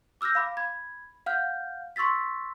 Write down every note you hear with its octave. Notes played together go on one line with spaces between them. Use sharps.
D6 E6 F6 G6 A#6
F5 B5 D6
B5 G#6
F5 F#5 F6 G6
C6 C#6 E6 A6 B6